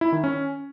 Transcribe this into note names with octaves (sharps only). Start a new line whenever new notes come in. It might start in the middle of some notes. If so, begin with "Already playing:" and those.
E4
D#3
C#4